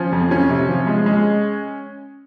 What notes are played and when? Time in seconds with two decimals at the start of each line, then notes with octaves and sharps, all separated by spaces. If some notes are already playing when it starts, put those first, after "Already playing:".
Already playing: F3 C#4
0.12 F2
0.31 F3 C#4
0.50 C3
0.69 F3
0.87 G#3
1.06 G#3